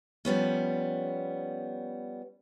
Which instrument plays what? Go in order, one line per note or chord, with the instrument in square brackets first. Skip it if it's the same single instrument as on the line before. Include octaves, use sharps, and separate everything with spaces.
[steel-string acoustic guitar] F3 G3 B3 C#4